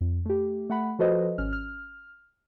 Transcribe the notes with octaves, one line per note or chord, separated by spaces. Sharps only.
F2
A3 G4
A3 F#5 B5
F3 F#4 A4 B4 C5 D#5
G#1 C#4 F6
F6